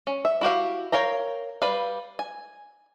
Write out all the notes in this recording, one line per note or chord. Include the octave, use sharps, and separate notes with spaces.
C#4
E5
E4 F#4 G4 F5
A#4 C#5 F5 G5 A#5
G3 B4 F5
G#5